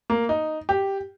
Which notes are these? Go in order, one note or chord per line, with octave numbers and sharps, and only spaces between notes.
A#3
D#4
G4